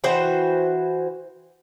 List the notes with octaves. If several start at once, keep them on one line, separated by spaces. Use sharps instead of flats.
E3 F#4 C5 G5